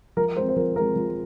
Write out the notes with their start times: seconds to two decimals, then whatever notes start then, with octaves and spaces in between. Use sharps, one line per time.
0.17 F3 A#4
0.36 G#3 C5
0.41 C4
0.49 C5
0.56 F3 A#4
0.76 G#3 C4 A#4
0.96 F3